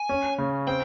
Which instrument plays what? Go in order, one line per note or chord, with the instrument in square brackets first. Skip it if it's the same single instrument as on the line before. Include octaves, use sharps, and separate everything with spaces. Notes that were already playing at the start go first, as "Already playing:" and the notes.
Already playing: [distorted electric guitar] G#5
[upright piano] C#4
C#3
[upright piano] C4 [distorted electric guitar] G5